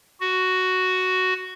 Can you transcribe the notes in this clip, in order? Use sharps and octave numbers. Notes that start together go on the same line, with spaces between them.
F#4